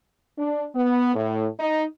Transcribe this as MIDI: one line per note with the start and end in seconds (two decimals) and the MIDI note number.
0.38 0.66 62
0.76 1.14 59
1.15 1.47 45
1.60 1.84 63